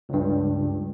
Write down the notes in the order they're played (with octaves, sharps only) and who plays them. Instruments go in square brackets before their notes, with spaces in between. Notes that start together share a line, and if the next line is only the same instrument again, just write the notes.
[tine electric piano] C#2 G2